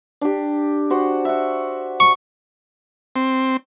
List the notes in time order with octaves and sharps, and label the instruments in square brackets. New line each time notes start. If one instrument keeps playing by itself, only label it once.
[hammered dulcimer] D4 G4
F#4 C5 F#5
E5 F#5
[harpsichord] C#6
[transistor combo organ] C4